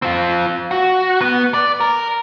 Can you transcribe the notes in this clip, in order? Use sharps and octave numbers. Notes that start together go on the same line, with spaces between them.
C4 F4
F#4
B3
D5
A#4